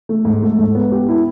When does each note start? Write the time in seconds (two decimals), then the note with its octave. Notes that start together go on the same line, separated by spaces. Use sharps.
0.09 A3
0.25 G#2
0.42 A3
0.59 G#2
0.75 B3
0.92 G4
1.09 E4